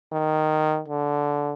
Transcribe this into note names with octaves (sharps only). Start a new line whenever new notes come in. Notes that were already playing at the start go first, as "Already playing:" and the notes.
D#3
D3